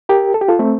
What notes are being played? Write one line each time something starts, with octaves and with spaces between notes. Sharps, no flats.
G4 A#4
A4
G4
F4 A4
A3 C4